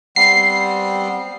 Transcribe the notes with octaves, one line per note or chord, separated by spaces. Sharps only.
G3 B3 C4 C7